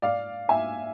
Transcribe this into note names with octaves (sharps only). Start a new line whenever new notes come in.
D5 F5
E5 G#5